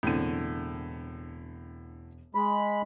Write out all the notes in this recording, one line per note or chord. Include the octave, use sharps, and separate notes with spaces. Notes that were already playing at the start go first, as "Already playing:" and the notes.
E1 A2 D3 C4 D#7
G#3 B5